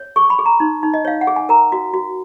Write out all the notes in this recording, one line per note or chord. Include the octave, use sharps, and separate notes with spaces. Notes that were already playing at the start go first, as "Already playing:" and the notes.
Already playing: C#5
G#4 C#6
B5
G#4
A#5
D#4
D#4
D#5
C#5 F5
F#5
G#4
G#5
A#4 A#5
F#4
F#4